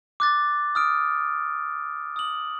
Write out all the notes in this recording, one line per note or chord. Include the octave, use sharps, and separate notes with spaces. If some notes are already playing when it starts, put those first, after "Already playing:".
D6 F#6 A6
D#6 F6 D7
D#6 F#7